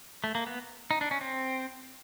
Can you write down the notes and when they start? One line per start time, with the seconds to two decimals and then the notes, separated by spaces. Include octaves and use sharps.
0.24 A3
0.35 A#3
0.46 B3
0.91 D#4
1.01 D4
1.11 C#4
1.21 C4